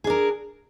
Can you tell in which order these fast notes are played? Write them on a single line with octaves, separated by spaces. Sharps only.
G#4 D4 A#4